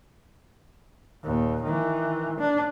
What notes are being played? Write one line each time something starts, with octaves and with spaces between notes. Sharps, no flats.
D#2 A#2
D#3 E3
D4